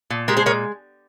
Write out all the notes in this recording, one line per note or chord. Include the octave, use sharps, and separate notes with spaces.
A#2
G#3 G4 A#4
G#4 C5
A#2 A#4 C#5